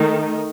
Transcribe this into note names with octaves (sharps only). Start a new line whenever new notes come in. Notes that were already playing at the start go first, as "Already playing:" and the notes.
Already playing: D#3 A3 D#4